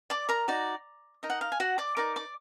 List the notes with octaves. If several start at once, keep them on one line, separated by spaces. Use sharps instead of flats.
D5 D6
A#4 A#5
D#4 F#4 D5
D#4 A#4 D#5
F#5
F5
G#5
F#4 F#5
D5 D6
D#4 A#4 D5 D6
D5 D6